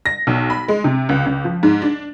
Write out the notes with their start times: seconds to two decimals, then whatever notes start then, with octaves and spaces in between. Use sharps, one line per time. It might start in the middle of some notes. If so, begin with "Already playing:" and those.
0.06 A#6
0.27 B1
0.50 B5
0.68 G#3
0.84 C3
1.09 C#2
1.26 C#2
1.44 F3
1.63 G#2
1.82 D4